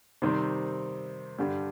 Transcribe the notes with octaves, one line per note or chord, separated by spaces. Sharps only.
C3 D#3 G3 C4
G2 D3 G3